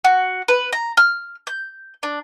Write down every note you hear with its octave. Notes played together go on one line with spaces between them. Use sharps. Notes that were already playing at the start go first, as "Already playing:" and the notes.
F#4
B4
A#5
F6
G6
D4